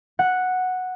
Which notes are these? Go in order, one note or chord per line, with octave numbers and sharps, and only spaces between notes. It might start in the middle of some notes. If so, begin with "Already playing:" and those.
F#5